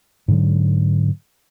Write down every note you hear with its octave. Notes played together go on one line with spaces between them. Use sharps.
G#2 D3 F#3